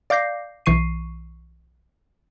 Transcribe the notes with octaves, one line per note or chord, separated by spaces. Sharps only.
D5 F5 D6 G6 A#6 C7
B1 E3 C#6 C7 D#7